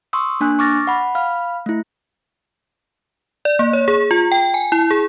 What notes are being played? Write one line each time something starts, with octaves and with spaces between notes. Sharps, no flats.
C6 C#6 D#6 E6
A#3 D4 G#5 F#6
C#6 D6 F6 A6 A#6
F#5 B5
F5 B5 F6
A3 E4
D5
A#3
C#5
G#4
F4
G5
G#5
E4
G#4